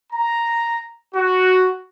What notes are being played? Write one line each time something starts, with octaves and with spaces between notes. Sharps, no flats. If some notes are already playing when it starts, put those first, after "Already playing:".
A#5
F#4